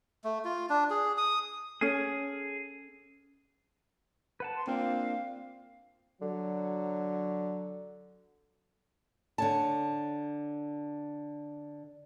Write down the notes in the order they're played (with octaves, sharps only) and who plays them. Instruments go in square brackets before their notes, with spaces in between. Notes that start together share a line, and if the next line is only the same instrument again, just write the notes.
[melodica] A3
F4
D4
G#4
D#6
[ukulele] C#4 A4 [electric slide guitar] G#4
[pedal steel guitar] B4 F#5 A5
[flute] C6
[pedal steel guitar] A#3 D4 F4 [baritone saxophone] C4 [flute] F5
[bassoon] D3 [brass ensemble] F#3
[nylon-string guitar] D3 C#5 A5